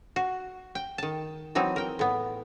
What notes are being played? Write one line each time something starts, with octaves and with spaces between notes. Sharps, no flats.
F#4
G5
D#3 A5
E3 F#3 C4 D#4
A#4 G5
A2 B3